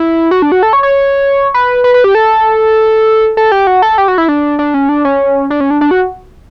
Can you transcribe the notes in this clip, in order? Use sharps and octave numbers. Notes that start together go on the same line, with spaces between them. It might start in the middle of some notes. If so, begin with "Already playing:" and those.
Already playing: E4
F#4
D4
F#4
A4
C#5
C#5
B4
B4
B4
G4
A4
A4
G4
F#4
A4
G4
F#4
E4
D4
D4
C#4
D4
C#4
D4
C#4
D4
D4
F#4